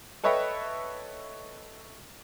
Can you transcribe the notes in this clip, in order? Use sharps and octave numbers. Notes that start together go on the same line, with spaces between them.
A4 B4 C#5 D#5 E5 G5